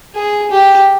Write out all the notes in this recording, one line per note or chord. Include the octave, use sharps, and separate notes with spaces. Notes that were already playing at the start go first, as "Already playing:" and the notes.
G#4
G4